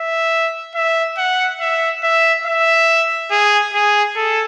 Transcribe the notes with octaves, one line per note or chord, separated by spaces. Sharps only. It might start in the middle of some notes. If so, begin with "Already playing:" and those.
Already playing: E5
E5
F#5
E5
E5
E5
G#4
G#4
A4